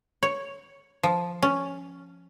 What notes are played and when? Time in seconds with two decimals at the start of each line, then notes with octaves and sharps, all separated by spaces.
0.23 C#5
1.03 F3
1.42 C#4